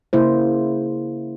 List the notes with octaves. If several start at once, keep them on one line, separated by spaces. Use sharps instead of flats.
C#3 A#3 E4 C5